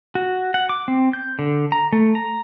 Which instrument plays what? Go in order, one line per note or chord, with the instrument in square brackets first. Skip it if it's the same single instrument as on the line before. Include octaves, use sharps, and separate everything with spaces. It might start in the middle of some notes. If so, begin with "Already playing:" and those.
[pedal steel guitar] F#4
F#5
D6
C4
G6
D3
A#5
A3
A#5